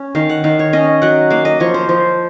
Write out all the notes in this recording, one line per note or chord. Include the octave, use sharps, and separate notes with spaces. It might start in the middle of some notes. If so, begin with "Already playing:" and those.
Already playing: C#4
D#3 F5
F#5
D#3 F5
C#5
C#4 D#5
F#3 F#5
A#3 F5
D#5
F3 C#5
C5
F3